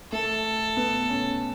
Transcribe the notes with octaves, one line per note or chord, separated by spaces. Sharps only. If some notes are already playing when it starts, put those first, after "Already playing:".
A3 A4
B3
C#4